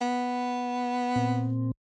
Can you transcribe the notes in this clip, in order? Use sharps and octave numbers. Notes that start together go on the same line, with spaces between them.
B3
A#2 C4